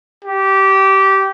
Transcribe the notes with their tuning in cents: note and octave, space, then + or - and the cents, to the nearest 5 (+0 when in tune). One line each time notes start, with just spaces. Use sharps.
G4 -20